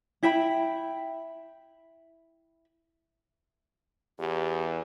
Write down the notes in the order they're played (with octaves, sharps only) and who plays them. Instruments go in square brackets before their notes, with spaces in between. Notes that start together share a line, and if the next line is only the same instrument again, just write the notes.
[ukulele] E4 E5 G5 B5
[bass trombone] E2 [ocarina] G4